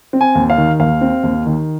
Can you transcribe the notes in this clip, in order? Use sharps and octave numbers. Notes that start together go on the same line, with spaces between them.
C4
G#5
D#2
F5
D#3
D#2 F5
C4
D#2
D#3